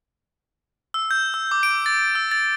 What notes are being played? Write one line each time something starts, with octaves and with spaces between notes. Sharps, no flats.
E6
G6
E6
D6
D7
A6
E6
A6